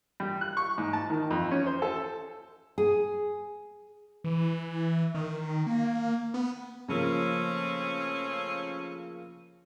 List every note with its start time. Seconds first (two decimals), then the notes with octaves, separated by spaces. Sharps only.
0.20 G3
0.41 F#6
0.57 C#6
0.78 G#2
0.93 A5
1.10 D#3
1.31 F2
1.51 C#4
1.66 C5
1.82 A4
2.78 G#4
4.24 E3
5.15 D#3
5.67 A#3
6.34 B3
6.88 C#3 F3 A3 A#3 C4 C#4